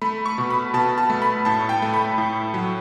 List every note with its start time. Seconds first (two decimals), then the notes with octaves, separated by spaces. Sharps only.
0.02 A3 B5
0.26 C#6
0.38 B2
0.50 B5
0.74 B2 A5
0.98 A5
1.10 A3
1.22 B5
1.45 A2 A5
1.69 G5
1.82 A3
1.94 B5
2.18 A2
2.54 F#3